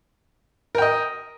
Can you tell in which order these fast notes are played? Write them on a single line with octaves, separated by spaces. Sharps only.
A#4 G5 D#5